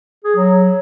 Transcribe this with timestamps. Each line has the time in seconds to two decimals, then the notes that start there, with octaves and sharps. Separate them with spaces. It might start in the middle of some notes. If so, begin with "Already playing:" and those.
0.25 G#4
0.36 F#3